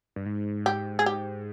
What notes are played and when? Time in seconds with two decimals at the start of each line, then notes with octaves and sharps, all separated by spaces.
0.16 G2
0.26 G#2
0.66 G4
0.99 G#4
1.06 G4